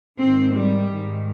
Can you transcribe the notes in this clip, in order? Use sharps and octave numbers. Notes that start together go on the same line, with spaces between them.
G#2 D#3 C4
G3
G#2 D#3